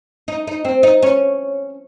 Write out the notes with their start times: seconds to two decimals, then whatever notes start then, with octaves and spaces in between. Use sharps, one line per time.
0.28 D#4
0.47 D#4
0.65 C4
0.83 D#4
1.02 C#4